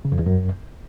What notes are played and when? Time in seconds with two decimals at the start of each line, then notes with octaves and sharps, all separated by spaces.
0.05 C#3
0.12 F2
0.19 E2
0.26 F#2